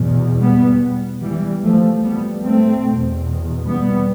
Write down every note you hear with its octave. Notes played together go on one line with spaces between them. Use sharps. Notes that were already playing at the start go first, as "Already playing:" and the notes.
Already playing: E2 B2
G3 B3
E3 G3
F3 A3
G3 B3
A3 C4
E2 B2
G3 B3